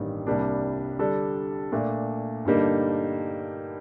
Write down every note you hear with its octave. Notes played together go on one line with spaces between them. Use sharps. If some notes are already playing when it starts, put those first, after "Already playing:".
Already playing: A1 G2 D#3 G3 A#3
C2 C3 G3 A#3 D4
D3 G3 D4 A4 D5
A#2 A3 D4
G2 D3 G3 A#3 D#4